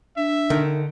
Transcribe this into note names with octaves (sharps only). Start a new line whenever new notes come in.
D4 E5
D3 D#3